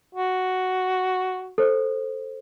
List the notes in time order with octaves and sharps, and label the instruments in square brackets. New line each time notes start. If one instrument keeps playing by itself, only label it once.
[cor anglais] F#4
[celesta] A4 C5